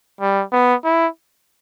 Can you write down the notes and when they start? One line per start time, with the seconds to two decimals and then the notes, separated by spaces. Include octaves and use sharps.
0.21 G3
0.52 B3
0.84 E4